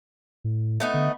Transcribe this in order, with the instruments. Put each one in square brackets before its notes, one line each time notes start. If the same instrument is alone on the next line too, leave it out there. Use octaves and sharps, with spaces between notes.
[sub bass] A2
[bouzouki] A3 B3 D#4
[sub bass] D3